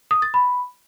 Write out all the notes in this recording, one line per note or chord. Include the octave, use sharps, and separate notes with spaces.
D#6
A6
B5